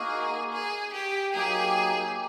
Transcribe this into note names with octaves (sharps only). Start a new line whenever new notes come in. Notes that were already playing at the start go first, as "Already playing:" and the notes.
Already playing: A#3 D#4 F#4 G#4 A#4
G#4
G4
F#3 A#3 D#4 G4 G#4